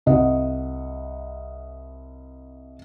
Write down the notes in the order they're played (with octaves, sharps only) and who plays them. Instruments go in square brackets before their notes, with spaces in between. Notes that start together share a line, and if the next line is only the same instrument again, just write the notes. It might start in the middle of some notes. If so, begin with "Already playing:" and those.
[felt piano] C2 D#5 F#5